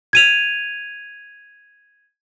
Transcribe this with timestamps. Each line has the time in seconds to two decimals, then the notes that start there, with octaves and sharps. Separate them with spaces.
0.13 G#6 D#7 F7